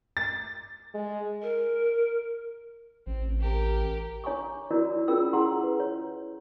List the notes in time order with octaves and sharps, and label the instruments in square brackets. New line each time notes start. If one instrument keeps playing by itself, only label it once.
[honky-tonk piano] A6
[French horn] G#3
[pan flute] A#4
[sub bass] A1 [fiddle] C4
[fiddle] G4 A#4
[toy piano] D4 C#5 G#5 A#5 C#6 D6
D#4 E4 F#4 A#4 C#5 D5
C#4 F4 G#4 A#4 G5 E6
E4 G4 G#4 F#5 A#5 C6
B4
C#5